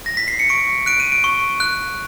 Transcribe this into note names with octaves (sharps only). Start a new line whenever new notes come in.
A#6
B6
C7
C#7
C#6 D7
F#6 D7
D#7
D7
C#6
F#6